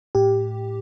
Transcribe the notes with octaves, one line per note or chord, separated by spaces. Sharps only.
A2 G4